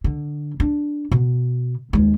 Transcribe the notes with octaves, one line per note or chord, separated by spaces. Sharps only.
D3
D4
B2
D#2 G#3